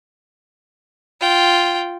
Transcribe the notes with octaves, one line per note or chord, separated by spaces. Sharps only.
F4 G5